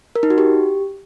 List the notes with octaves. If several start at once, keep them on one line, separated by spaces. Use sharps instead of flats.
A#4
D#4
F#4
G4